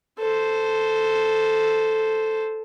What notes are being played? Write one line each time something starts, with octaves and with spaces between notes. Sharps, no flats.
A4 C5